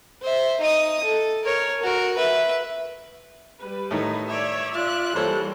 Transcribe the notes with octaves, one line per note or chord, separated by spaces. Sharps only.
C5 E5
D#4 D#6
A4
A#4 C#5
F#4 A#4
B4 E5
G3 B4
A2 D#3 A3 D#4
C#5 D5 E5
F4 F#6
E3 G3 A#3 A4 C5 C#5